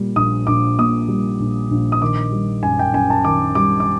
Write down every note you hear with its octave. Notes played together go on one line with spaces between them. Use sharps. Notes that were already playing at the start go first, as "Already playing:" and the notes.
Already playing: A#2 G3
A#1 D#6
A#1 D6
A#2 D#6
G3
A#1
A#1
D#6
D#3 D6
G3
F#2 G#5
G5
F#2 G#5
A5
D#3 D6
G3 D6
D6